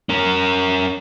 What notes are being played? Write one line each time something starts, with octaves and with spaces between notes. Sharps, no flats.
C#4 A#4